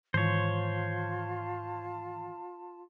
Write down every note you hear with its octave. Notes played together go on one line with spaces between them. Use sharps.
G#2 D#3 E3 F4 C5 C#5 A5